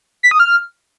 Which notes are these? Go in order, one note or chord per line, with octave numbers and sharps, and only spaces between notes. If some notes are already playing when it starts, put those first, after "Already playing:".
B6
D#6
F6